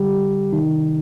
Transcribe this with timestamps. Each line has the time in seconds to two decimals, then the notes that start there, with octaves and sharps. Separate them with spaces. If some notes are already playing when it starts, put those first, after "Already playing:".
Already playing: D3 G3 G4
0.53 C3 D#3 D#4